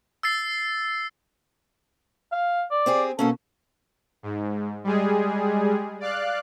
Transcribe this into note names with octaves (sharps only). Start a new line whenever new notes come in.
E6 A6 C7
F5
D5
C4 G4 G#4
B2 A#3 C#4 A4
G#2
G3 G#3 G#4
D5 F5 F#6